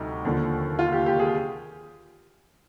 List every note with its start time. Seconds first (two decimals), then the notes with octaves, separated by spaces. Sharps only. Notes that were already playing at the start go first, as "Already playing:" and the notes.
Already playing: D2 C3 G3 D#4
0.25 D#2 D3 F3
0.79 F4
0.92 G4
1.06 G4
1.19 G#4